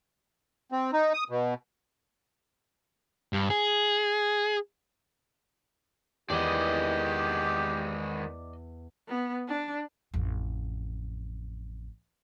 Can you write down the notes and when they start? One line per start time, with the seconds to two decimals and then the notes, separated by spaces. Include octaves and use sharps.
0.72 C4
0.93 D#4
1.14 D#6
1.30 B2
3.33 G2
3.50 G#4
6.30 E2 D#3 G#3 B3 G4 D5 D#5
9.08 B3
9.48 D4
10.14 A1 F2